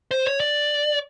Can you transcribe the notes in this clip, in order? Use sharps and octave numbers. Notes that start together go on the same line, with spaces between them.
C5
C#5
D5